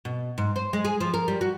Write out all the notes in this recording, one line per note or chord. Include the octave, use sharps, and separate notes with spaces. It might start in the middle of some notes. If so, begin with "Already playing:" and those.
B2
G#2
C5
G#3
G#4
F3
A#4
G3
F#4